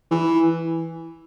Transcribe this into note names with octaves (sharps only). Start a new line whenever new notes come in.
E3